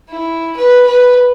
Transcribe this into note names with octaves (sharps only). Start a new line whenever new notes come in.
E4
B4
B4